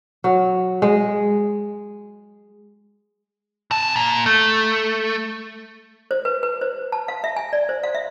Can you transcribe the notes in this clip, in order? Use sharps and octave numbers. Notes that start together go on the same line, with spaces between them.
F#3
G#3
C3 A5
A#2
A3
C5
B4
B4
C5
A5
F5
E5
G#5
D5
C5
F5
E5